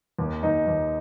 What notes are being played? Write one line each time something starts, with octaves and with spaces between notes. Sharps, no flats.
D#2
D#2 D#4
D#2